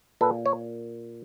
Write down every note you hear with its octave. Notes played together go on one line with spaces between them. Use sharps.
A#2 A4 B4
C#5